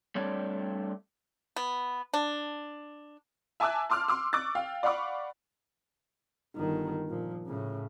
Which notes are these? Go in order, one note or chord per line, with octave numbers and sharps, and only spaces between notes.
G3 A3 C4 D4 C#5 D5
B3
D4
E5 G#5 A5 D6 E6 F#6
A5 C6 D6 E6 F6
C6 D6 E6
C#6 D6 E6 F#6 A6
F5 G5
D5 F5 F#5 B5 C#6 D6
G1 D#3
A#2 F3
A2 C#3